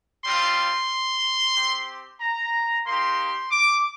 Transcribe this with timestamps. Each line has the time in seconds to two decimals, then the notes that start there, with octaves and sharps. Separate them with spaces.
0.25 G3 C4 F4 C6
1.56 C4 G4
2.21 A#5
2.86 A#3 D#4 G4 C6
3.51 D6